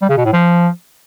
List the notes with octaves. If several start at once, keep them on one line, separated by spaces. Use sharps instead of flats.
G3
C#3
B2
A2
F3